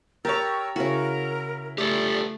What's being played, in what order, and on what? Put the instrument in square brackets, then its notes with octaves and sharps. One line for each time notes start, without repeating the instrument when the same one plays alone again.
[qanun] G4 A5 A#5 [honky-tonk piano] A#4 C#5 [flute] E6
[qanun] C#3 F#4 [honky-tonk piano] E4 [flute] A#4
[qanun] A3 [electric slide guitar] G4 A4 [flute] D5